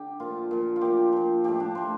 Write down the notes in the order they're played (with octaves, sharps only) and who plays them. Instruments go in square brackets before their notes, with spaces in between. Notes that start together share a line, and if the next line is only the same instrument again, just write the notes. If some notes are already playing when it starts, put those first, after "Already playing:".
Already playing: [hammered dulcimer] D3 G4
A#2 F3 F4
A#2 F3
F4
A#2 F3 G4
A#2 F3
A2 F3 G4
D4
A2 F3 C5